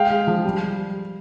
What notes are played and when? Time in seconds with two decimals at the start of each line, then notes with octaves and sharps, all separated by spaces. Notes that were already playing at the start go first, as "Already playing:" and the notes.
Already playing: G#3 F5 G5
0.10 G#3
0.27 F3
0.45 G3